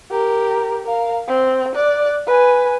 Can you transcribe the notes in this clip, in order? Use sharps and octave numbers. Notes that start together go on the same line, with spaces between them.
G4 A#4
A#4 F5
C4
D5 F#6
B4 G#5